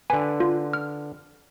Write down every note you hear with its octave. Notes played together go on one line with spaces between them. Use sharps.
D3 B4 G#5
F4
F6